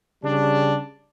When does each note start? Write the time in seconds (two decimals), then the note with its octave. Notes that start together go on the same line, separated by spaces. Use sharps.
0.24 C#3 G3 D4